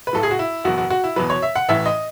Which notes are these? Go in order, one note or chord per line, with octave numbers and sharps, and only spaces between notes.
B4
B1 A2 F#3 A4
G#4
F#4
E4
F#1 E2 B2 F#3 F#4
F#4
F#4
E4
E2 B2 F#3 B4
C#5
E5
F#5
A1 A2 E3 E5
D#5